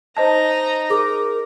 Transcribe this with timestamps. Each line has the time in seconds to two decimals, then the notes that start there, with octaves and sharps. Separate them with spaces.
0.17 D#4 C5 D#5 A5 A#5
0.90 G#4 A#4 D6